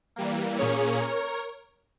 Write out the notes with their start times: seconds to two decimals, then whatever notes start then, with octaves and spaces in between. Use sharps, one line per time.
0.16 E3 G3 A#3
0.58 A#2 A#3 C#4 G#4 C#5
0.99 A#4 C#5